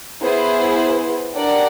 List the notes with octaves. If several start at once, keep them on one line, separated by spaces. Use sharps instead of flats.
B3 E4 G#4 C5
D4 G4 A#4 D5 F#5